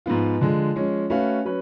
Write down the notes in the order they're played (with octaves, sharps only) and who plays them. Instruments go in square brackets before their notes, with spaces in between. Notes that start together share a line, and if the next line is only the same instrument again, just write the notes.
[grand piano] G#2 F3 B3 F4
D3 F3 G#3
F3 G#3 C#4
A3 C#4 F#4 B4 F5
F#3 C#4 B4